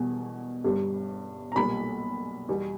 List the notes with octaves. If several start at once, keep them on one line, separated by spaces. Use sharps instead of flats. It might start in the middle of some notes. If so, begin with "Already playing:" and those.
Already playing: E1 E2 B2 G3
G1 G2 G3
A#5
B1 A#2 G3 B5
E2 B2 G3